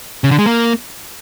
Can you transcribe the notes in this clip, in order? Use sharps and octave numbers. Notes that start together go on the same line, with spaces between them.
C#3
D3
G#3
A#3